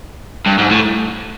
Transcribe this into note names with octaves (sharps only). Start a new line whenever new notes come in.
G2
G#2
A2